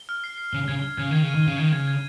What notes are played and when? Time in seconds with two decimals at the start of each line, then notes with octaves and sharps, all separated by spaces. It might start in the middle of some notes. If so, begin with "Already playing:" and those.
Already playing: G7
0.09 F6
0.24 C7
0.38 C7
0.53 C#3 G7
0.68 C#3 G#6
0.83 G7
0.98 C#3 G#6
1.11 D#3 G#6
1.23 C#3
1.28 D#7
1.35 D#3
1.43 C#3 G7
1.58 D#3 G#6
1.72 C#3 G#6
1.88 G#6